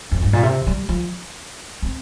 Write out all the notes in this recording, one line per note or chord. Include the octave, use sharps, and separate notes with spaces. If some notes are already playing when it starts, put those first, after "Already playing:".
F2
G2
A#2
C3
G3
F3
C4